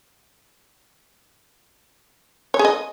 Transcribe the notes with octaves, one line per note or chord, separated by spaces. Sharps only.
C#5
G#4
D#5